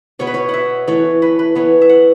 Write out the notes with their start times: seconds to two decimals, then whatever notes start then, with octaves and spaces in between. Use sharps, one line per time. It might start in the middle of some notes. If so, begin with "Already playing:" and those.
0.19 B2 B3 C#5
0.27 B4
0.34 C#5
0.49 E5 F#5
0.87 E3 A3 C#5
1.22 B4
1.39 B4
1.55 E3 B3 C#5
1.81 E5
1.89 F#5